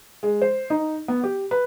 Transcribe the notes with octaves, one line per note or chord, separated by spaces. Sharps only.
G#3
C5
D#4
B3
G4
B4